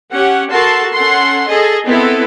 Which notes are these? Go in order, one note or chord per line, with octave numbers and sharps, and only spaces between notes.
C#4 G4 F#5
F#4 A4 A#4 A5 C6
C#4 A4 F#5 C6
G#4 A4 D#5
B3 C4 E4 A4 B4